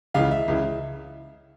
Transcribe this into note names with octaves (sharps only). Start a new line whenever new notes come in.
C#2 C#3 E3 F5
E5
C#2 C#3 E3